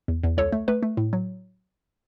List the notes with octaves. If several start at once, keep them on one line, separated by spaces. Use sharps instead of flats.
E2
E2
C#2 A4 C#5
A3
A3 B4
A3
A2
F#3